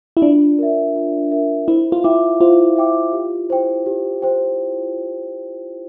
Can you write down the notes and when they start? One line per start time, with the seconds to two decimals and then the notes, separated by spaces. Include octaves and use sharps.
0.17 E4
0.22 D4 F4
0.59 A#4 E5
0.95 F4
1.31 A#4 E5
1.67 E4 C5
1.92 F4
2.04 E4 E5 G5 D6
2.40 F4 C5
2.76 E5 G5 D6
3.13 G4
3.50 C5 G5
3.86 G4
4.22 C5 G5